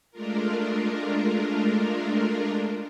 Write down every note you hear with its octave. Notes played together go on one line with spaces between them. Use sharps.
G#3 A3 D4 F4 A#4